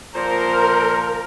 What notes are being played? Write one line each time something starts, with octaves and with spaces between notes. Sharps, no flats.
A#2 F3 A#4 C5